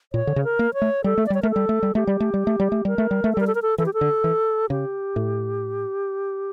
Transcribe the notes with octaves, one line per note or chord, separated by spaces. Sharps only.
A#2 C#5
D3
C#3
A#4
A#3
C#5
A3
G3 A4
A3
D5
G3 C#5
A3 A#4
A4
G3
A3
G3
A3 G4
G3
A3
G3
A3
G3
A3
G3 A#4
A3
G3
A3
A4
G3 A#4
A4
A#4
A4
E3 A4
G4
A4
D3
E3
C#3 G4
A2